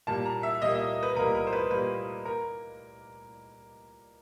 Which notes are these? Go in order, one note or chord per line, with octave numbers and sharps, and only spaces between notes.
A#2 G3 A#3 A5
A#5
E5
A#2 G3 A#3 D#5
E5
B4
A#2 G3 A#3 A#4
A#4
C5
B4
A#2 G3 A#3 B4
A#4